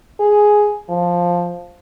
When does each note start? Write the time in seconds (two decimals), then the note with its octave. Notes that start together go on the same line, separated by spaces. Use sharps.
0.20 G#4
0.89 F3